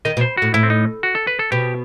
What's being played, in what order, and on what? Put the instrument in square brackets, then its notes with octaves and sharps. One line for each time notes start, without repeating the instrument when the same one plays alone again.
[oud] D#3 [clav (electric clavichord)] D#5
[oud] B2
[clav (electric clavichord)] C5
[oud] A2 [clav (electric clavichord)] F#4
[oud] A2 [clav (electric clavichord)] E4
[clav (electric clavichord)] C4
D#4
F#4
A4
B4
A4
[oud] B2 [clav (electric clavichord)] G4